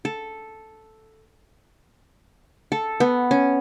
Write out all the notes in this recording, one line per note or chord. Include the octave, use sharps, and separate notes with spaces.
A4
A4
B3
C#4